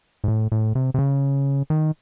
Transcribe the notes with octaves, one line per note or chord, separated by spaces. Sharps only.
G#2
A2
A2
C3
C3
C#3
D#3